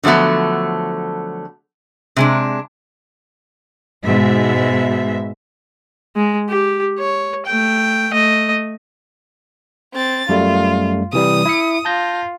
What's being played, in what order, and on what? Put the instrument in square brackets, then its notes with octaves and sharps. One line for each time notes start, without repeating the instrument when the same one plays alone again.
[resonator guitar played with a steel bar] D3 F3 F#3 A3 B3
C3 G#3 D4
[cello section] G#2 B2 E5
[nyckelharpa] G#3
G4
C#5
A3 G5
A3 D#5
[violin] C4 A6
[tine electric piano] F#2 G3 A3 [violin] F4
[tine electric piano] C3 E3 G3 [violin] D#6
[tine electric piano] E4 E5 C#7
[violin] F4 [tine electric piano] A5 G6 A#6